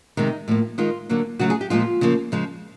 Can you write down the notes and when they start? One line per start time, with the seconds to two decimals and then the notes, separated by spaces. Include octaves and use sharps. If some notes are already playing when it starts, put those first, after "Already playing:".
0.17 C3 D#3 G#3 D#4
0.48 A2 F3 A#3
0.78 D#3 G#3 F4
1.09 D3 F#3 A#3
1.39 C#3 F#3 A3 F#4
1.50 G#4
1.61 G4
1.70 A#2 F3 G#3 F4
2.01 C#3 F3 A#3
2.32 C#3 F3 G#3